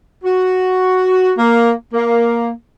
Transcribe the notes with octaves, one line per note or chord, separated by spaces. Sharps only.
F#4
A#3
A#3